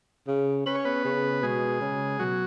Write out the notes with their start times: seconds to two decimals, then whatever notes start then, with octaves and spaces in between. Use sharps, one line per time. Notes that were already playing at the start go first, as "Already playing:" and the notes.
0.27 C#3
0.66 C#4 B4
0.75 C#5
0.85 B3 B4
1.05 C#3
1.42 B2 G#3 G#4
1.81 C#3
2.19 B2 F#3 F#4